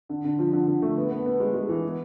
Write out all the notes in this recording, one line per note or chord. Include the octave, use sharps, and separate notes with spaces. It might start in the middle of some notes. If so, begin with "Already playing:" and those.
D3
D3
F3
D3
D3
A3
B3
B3
B3
G#3
G#3
E3
B3